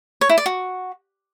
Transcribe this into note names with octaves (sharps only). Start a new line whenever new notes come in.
C#5
E4
D5
F#4